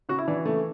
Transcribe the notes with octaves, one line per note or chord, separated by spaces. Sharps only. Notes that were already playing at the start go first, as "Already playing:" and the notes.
C#3 F#4
E4
E3 D4
C#3 A3